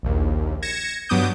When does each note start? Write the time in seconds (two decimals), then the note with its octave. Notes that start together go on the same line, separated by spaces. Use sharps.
0.03 A#1 D#2
0.62 G#6 A#6 C#7 E7
1.09 G2 F#3 B3 D6 D#6 G6